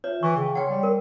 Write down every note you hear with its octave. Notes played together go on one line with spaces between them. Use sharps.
F4 C#5 E5
E3 C#6
C#3 G5
C#5 F#5 G5 C6
G3
A#4